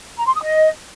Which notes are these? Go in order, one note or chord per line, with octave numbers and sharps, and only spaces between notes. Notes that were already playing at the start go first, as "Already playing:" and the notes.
A#5
C6
D#6
D#5